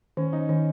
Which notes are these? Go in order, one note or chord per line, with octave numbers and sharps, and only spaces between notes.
D#3 C#4
D#4
D#3 C#4